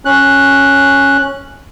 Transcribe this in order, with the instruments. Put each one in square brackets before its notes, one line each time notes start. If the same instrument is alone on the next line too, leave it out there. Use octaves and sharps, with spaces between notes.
[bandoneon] C#4 F#6